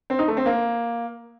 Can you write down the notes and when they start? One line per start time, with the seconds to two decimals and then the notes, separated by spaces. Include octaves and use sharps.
0.10 C4
0.19 D#4
0.28 A3
0.37 C4
0.46 A#3